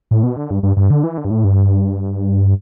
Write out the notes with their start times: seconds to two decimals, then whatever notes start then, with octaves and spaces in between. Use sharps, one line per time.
0.11 A2
0.23 B2
0.36 D3
0.50 G2
0.63 G2
0.77 G2
0.90 D3
1.04 E3
1.17 D3
1.25 G2
1.31 A2
1.44 G2